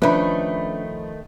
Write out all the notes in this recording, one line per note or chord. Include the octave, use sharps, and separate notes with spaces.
D#3 F3 A3 C#4 D4 B4 B5